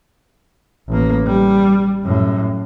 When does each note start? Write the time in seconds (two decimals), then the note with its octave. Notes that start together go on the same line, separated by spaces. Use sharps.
0.88 A1 A#3
1.26 G3
2.04 F#2 A2